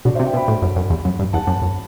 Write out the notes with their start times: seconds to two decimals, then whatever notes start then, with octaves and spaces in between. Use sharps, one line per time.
0.05 B2 D4 F#4
0.15 C5 E5
0.19 C3
0.26 E5 G5
0.34 B2
0.37 G5 B5
0.48 A2
0.62 F#2
0.76 F#2
0.90 E2
1.05 F#2
1.19 G2
1.33 E2 F#5 A5
1.47 F#2
1.62 F#2